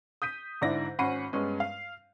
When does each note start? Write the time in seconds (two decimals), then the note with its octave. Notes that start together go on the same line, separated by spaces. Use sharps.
0.22 D#6 G6 B6 D#7
0.61 G#2 D3 E4 D5 A#6
0.99 G#1 C#4 F#5 B5 C7 D#7
1.33 G2 G#3 B3 C#4
1.60 F5